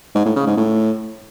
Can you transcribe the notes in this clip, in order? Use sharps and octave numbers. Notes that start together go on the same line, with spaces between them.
G#2
A2
C#3
G#2
A2